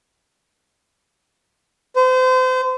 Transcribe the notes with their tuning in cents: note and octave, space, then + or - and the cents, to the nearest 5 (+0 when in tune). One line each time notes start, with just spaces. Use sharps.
C5 -35